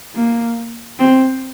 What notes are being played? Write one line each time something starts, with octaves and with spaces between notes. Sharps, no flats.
A#3
C4